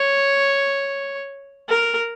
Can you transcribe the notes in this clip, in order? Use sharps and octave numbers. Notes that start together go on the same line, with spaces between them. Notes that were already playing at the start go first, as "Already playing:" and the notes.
Already playing: C#5
A#4